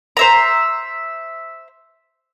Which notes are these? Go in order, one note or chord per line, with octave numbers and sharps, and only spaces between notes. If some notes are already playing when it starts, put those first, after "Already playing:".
C5 E5 A#5